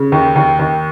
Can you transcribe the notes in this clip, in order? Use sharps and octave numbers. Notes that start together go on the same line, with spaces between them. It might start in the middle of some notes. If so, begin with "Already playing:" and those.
Already playing: C#3
D#2
D#2
D#2